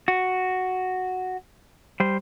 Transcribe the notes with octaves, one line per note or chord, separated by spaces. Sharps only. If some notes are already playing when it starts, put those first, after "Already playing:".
F#4
G3 C5